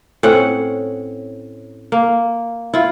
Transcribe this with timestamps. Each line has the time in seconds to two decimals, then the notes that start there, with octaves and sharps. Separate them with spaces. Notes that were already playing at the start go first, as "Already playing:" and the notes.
0.23 A2 C4 C#4 F#5
1.92 A#3
2.74 E4 F4